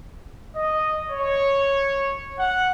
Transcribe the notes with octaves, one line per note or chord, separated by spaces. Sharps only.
D#5
C#5
F#5